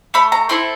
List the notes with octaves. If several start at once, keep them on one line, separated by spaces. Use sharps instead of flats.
A3 B5
A#5
C4 E4 A4 C6